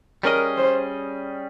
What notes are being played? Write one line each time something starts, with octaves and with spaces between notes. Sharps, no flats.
G3 C#4 G#4 A#4 D#5
C5